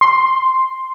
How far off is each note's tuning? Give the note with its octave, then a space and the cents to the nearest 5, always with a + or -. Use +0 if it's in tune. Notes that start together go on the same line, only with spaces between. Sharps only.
C6 +0